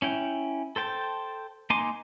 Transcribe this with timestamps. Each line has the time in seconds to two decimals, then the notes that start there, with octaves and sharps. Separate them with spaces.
0.02 C#4 E4 G5
0.76 A4 C5 G5 A5
1.70 A#3 D#4 G#5 C6 D6